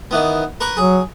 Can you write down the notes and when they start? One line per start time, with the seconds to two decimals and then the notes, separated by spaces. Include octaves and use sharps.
0.11 D#3 E3 B3
0.60 A#4 B4 C#6
0.77 F#3 G#4